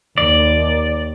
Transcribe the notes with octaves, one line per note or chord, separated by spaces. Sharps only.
D#2 D5